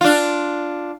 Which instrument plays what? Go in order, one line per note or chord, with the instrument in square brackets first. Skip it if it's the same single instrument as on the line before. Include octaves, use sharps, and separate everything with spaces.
[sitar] D4 F4